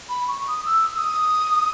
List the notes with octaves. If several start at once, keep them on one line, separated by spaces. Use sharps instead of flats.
B5
C#6
D#6
E6
E6
D#6